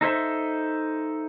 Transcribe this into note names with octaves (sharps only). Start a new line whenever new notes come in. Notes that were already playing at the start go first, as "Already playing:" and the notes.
D#4 A4 C5 E5